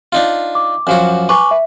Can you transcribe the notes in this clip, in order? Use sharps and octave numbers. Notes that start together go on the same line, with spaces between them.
D4 D#4 F4
D6
F#2 F3 F#4
B4 G#5 C#6 D6
E5